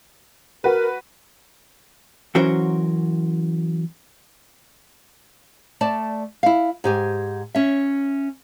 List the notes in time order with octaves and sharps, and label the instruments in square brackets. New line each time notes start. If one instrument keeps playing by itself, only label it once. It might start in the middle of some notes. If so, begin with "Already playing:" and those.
[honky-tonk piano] F#4 B4 [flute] A#4
[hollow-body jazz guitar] E3 F#3 C#4 F#4 A#4 C5
[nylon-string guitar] A3 D5 A5
E4 F5
G#2 G4 G#5
C#4 E5